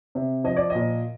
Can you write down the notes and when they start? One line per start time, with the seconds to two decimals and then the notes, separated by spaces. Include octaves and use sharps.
0.15 C3
0.44 F3 D#5
0.57 D5
0.70 A#2 D#5